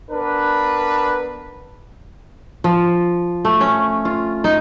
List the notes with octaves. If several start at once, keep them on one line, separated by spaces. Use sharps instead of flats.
B3 D4 A#4 B4
F3
A3
C#4
F4
D#4